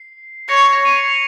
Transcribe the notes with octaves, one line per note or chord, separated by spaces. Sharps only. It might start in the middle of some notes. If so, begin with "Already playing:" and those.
Already playing: C7
C#5 A#6 C#7
A#6 C#7
A#6 C#7
C7 D#7
C#7 F7
C#7 F7